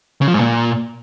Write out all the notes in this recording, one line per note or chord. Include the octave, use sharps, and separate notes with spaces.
C#3
F3
G#2
A#2